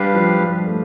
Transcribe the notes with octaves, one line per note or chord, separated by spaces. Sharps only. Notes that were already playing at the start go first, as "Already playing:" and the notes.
Already playing: G3 D4 G4 B4 F5
F3
G3
A3